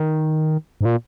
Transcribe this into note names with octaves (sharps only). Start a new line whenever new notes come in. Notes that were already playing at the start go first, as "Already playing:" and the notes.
Already playing: D#3
G#2
A#2